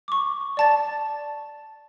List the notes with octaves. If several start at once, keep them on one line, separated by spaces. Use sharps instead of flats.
C#6 D6
D5 A5 A6